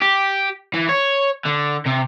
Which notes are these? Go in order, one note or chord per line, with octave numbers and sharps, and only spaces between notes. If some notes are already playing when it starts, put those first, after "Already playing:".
G4
E3
C#5
D3
C3